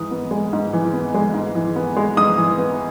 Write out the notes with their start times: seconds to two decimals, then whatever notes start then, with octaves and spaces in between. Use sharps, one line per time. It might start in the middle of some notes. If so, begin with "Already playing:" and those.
Already playing: G#2 E3 D#6
0.11 B3
0.31 G#3
0.53 G#2
0.73 E3
0.93 B3
1.14 G#3
1.34 G#2
1.55 E3
1.76 B3
1.97 G#3
2.17 G#2 D#6
2.38 E3
2.58 B3